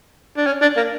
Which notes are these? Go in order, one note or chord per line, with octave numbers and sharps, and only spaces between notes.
D4
C#4
D4
A#3